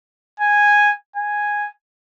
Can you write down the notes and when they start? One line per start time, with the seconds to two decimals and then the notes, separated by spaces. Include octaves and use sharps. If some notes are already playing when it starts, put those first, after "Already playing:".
0.40 G#5
1.16 G#5